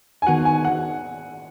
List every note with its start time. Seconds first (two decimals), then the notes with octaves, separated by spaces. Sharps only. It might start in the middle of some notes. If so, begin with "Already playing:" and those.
0.22 G#5
0.27 D#3 B3 F#4 F#5
0.45 G#5
0.65 F#5